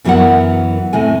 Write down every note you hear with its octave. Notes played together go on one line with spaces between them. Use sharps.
F#2 E3 F#3 B3 A#4 F#5
A2 C3 G#5